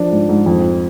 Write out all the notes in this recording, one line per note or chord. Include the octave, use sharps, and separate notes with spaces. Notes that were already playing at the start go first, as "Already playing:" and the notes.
Already playing: F3 D4
G#2
G#2
F2